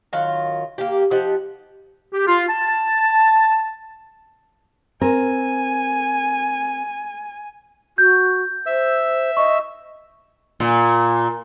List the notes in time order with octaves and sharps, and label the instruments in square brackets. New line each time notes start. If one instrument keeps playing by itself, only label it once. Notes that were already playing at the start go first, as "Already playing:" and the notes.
[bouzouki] D#3 F#3 F4
A#3 G4
F3 D#4 G4 F#5
[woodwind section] G4
F4
A5
[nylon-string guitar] C4 A#4 [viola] G#5
[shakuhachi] F#4 [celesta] G6
[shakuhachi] C5 [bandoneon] E5 E6
[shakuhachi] D#5 [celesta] C#6
[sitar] A#2